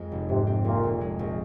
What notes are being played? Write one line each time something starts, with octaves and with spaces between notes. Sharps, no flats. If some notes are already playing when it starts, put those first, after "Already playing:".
Already playing: F2 G#3
F1
G#2 C3
C4
A#1 A#2
A#1
G#3
A#1